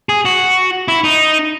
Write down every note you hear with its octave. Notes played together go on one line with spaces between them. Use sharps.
G#4
F#4
E4
D#4